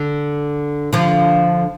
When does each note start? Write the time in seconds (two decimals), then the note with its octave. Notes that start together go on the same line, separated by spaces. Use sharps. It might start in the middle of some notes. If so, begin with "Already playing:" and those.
Already playing: D3
0.93 D3 F3